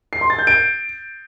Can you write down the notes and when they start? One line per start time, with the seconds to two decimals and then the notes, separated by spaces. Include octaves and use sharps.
0.13 C7
0.21 C6
0.30 A6
0.39 G6
0.47 D7